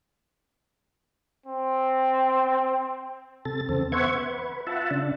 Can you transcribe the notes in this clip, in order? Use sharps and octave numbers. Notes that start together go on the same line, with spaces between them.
C4
C3 A4 A6
E2 C#3 C4 A4
B3 C5 E5 F#5 C#6 G#6
B4
F4 E5 F#5 A5
C#3 D4